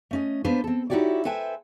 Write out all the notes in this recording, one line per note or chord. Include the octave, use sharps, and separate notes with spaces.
A3 C#4 D#5
A#3 B3 D4 B4 C5
C4 A4
D#4 E4 F#4 G4 C#5 D5
A4 B4 C5 E5 G5 G#5